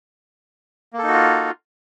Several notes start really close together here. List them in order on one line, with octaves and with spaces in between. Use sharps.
A#3 A4 D#4 F#4 F4